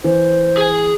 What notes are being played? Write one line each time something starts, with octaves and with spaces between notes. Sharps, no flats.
E3 C5
G#4 G#5